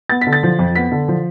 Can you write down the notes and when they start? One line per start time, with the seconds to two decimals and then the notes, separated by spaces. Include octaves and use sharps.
0.10 B3 A6
0.21 B6
0.27 D3
0.33 A6
0.43 F3
0.59 F2
0.75 B3 B6
0.92 D3
1.08 F3